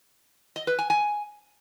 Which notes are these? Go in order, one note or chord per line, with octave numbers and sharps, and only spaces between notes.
D#5
B4
G#5
G#5